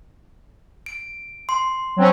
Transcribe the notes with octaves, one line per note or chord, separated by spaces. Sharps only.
D7
C6
F#3 C4 C#4